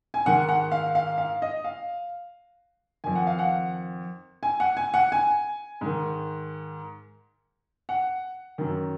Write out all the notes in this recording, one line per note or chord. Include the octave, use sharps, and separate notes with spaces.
G#5
G#2 D#3 F#5
F#5
F5
F5
F5
D#5
F5
F2 D#3 G#5
F#5
F5
F#5
G#5
F#5
G#5
F#5
G#5
G#2 D#3
F#5
F#2 D#3